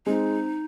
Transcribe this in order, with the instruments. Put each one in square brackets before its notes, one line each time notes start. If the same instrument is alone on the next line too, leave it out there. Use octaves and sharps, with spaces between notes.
[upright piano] G#3 C4 [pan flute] D#4